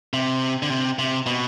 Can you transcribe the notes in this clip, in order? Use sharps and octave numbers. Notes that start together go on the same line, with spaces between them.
C3
D3
C3
C3
B2